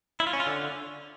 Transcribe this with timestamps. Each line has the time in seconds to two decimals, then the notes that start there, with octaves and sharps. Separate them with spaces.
0.20 E4
0.27 F4
0.33 C#4
0.40 F4
0.47 D3